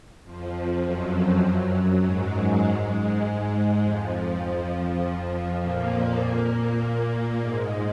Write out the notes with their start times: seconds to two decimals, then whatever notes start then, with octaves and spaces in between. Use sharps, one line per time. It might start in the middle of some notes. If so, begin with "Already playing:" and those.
0.24 F2 F3
0.84 F#2 F#3
2.03 G#2 G#3
3.82 F2 F3
5.61 A#2 A#3
6.20 A#2 A#3
7.39 G#2 G#3